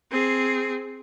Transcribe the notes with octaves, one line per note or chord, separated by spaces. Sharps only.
C4 G#4